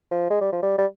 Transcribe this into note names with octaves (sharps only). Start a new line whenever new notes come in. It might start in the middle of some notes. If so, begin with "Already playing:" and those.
F3
G#3
G3
F3
G3
G3